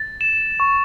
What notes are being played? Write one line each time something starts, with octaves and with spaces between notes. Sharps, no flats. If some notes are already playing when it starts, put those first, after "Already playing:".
Already playing: A6
E7
C#6